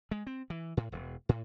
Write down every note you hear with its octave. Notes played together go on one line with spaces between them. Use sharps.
G#3
C4
E3
A2
E1
A2